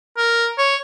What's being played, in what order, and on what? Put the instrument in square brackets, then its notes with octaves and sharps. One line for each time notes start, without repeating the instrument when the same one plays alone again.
[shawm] A#4
C#5